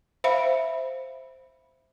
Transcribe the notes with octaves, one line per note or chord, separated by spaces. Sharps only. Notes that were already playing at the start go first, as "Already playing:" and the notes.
C5 E5 F5 B5